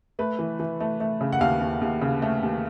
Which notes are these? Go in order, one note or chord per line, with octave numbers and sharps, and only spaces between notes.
A3 B4
E3
E3
A3
A3
C#3
F#5
D#2 F5
D#2
D#2
C#3
A3
D#2